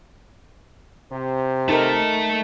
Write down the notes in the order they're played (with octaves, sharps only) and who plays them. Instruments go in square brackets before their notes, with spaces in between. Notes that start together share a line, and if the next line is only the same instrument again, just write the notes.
[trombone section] C3 C5
[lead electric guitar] A3 A4 [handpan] D#4 A#4